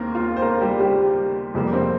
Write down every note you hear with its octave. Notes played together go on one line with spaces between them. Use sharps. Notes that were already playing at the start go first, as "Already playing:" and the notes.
Already playing: D#2 D#3 A#3 C4 A#4
F4
C5
A#3 A#4
G3 G4
G3 G4
F2 C3 G3 A#3
C4 C5